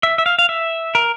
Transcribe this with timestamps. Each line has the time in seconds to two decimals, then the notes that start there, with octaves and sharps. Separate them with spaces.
0.03 E5
0.18 E5
0.26 F5
0.39 F5
0.49 E5
0.95 A#4